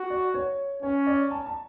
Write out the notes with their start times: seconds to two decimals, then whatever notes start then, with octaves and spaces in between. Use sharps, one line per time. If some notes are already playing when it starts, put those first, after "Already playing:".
Already playing: F#4
0.10 D5
0.34 C#5
0.83 C#4 C#5
1.07 D5
1.31 A5
1.46 A5